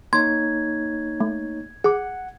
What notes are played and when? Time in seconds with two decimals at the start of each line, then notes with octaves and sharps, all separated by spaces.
0.13 A#3 D#4 C#5 C6 G#6
1.20 A3
1.84 G#4 F#5 D6